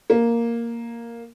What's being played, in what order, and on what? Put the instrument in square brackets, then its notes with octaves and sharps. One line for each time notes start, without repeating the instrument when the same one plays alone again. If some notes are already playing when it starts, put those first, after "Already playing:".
[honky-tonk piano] A#3